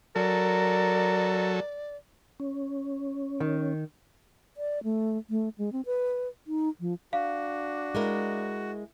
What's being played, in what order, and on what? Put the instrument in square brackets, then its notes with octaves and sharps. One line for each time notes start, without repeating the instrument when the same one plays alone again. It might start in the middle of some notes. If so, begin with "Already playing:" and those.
[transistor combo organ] F#3 A4 [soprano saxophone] A#4 [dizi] D5
[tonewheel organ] C#4
[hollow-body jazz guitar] D#3
[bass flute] D5
A3
A3
G#3
C4
B4
D#4
F3
[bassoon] D4 [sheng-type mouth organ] F#4 [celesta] F5
[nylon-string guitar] G#3 E4 A#4